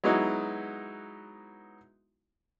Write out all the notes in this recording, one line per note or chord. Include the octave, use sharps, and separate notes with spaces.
F#3 G#3 B3 D#4 E4 F#4